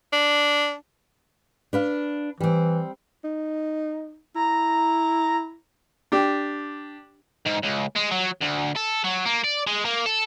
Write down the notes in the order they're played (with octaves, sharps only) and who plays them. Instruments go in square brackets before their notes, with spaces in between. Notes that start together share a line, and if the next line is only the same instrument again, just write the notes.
[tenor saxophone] D4
[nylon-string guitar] D4 B4 F5
[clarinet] E3 [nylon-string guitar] G3 C4
[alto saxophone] D#4
[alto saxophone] E4 [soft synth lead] A#5
[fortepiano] D4 G4
[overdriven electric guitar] G#2
C#2
G#3
F#3
D2
A4
F#3
A#3
D5
G#3
A#3
A4